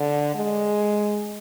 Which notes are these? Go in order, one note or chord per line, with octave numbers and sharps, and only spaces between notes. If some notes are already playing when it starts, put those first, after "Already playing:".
Already playing: D3
G#3